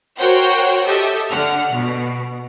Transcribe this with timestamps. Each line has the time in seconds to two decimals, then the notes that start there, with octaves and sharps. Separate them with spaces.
0.19 F#4 A#4 C5 C#5 F#5 G5
0.85 G4 A4 D#5 E5
1.29 D3 F#5 F6
1.72 B2